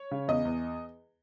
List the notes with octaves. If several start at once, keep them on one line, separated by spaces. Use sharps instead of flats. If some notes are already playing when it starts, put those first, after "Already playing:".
Already playing: C#5
C#3
E2 D#5
E2